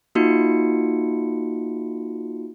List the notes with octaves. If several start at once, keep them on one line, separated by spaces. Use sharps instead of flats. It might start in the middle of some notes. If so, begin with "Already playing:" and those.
A#3 D#4 F4 F#4 C#7